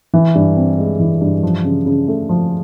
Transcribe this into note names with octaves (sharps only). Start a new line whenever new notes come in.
E3
G2
C4
G#3
E3
G2
F3
C#3
C#3
A3
F3